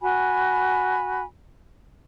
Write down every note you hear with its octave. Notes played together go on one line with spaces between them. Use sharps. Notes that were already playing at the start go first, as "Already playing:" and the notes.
F#4 G#5 B5